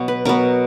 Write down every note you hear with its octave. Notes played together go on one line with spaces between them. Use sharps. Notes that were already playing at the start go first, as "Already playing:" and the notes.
Already playing: B2 F#3 B3 C#5
B4
B2 F#3 B3 A#4